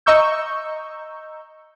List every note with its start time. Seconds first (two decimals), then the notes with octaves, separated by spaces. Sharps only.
0.06 D#5 A#5 C#6 E6 G6